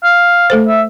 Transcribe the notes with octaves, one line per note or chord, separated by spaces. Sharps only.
F5
A3 A4 C5
E5